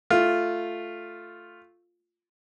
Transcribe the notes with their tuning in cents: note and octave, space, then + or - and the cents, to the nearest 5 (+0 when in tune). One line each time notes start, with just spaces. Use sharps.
A3 +0 F4 +0